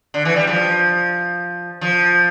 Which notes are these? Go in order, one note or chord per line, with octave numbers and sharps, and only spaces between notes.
D3
E3
G3
F3
F3